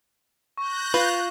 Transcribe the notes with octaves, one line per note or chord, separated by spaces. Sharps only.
C#6 F#6 G6 A#6
F4 B4